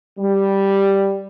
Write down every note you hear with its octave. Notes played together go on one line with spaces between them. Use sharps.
G3